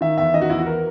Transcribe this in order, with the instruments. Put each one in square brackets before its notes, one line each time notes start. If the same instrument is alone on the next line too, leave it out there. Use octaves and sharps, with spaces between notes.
[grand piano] D#3 E5
E2 E5
D#3 D#5
F#4
E2 E4
F#4
E3 A#4